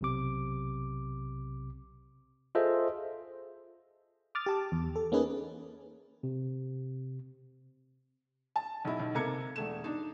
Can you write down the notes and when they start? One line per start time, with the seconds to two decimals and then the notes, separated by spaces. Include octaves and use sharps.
0.01 B1 C3 D6
2.55 F4 G#4 A4 C5 D#5 E5
4.35 D6 D#6 F6 A6
4.46 G4 A5 D6
4.72 E2
4.96 A4
5.12 A#3 C#4 D#4 G#4 B4
6.23 C3
8.56 A5
8.85 B1 E4
9.00 B1
9.15 C3 A#3 A4 A#5 G#6 C#7
9.56 E1 A3 E7
9.84 D4 D#4